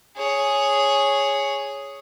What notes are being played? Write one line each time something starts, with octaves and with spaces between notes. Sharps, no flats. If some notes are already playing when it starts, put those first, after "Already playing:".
G#4 C#5